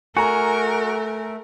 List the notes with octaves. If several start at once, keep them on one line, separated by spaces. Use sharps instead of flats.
A3 F#4 A#4 G#5 A#5